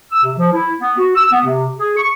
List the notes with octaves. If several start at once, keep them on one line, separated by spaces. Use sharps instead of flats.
E6
C3
F3
E4
B3
F#4
E6
B3
C3
G#4
C#6